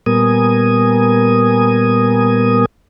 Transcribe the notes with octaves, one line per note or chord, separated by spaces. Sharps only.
A#2 G3 B3 A#4 G#5 D#6